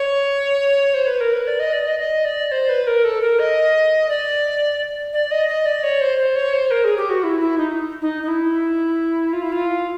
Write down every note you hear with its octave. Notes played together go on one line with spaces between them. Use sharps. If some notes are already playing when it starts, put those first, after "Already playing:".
Already playing: C#5
C5
B4
A#4
B4
D5
D#5
D5
D#5
D#5
D5
C5
B4
A#4
A4
A#4
D#5
D5
D5
D#5
D#5
D5
C#5
C5
C5
C#5
C5
A#4
G#4
G4
F#4
E4
E4
D#4
D#4
D#4
E4
F4
E4
F4